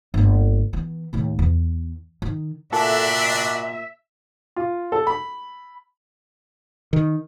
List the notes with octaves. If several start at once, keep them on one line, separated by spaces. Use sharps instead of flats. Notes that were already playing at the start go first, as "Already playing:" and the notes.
G1 A#3
E3 B3
D#2 A2
E2
D#3
A#2 D4 F#4 A4 E5
F4
A4
B5
D#3